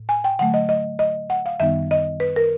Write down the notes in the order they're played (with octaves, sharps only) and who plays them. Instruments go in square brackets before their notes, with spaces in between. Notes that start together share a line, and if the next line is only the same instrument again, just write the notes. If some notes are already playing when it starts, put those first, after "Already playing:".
Already playing: [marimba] A2
G#5
G5
D3 F#3 A3 F#5
D#5
D#5
D#5
F#5
F5
F#2 D#3 G3 B3 D#4 E5
D#5
B4
A#4